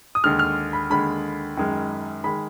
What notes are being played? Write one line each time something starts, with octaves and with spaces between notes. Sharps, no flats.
D#6
D#2 D3 G#3 F6
F6
B5
D#2 D3 G#3 B5
F#2 D#3 G#3
D#3 G#3 B5